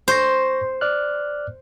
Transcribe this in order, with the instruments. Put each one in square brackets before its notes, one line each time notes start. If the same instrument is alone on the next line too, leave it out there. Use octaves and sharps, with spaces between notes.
[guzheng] C5 [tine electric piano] C6 C#6 A#6
[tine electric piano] D5 F6 F#6